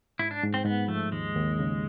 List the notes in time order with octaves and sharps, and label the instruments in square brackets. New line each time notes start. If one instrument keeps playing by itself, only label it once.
[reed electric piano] G#2 [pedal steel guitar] E4
[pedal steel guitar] D4
[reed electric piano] G#2
[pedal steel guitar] C4
[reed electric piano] G#2 [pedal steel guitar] B3
[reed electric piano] F3 [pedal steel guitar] A3
[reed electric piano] D#2 [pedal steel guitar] G#3
[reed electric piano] D#2
C#3